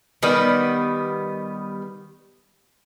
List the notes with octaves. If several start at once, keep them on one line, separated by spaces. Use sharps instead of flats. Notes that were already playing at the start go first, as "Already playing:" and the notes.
D#3 G3 B3